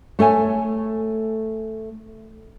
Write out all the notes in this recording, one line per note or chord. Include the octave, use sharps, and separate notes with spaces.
A3 A4 C#5 G#5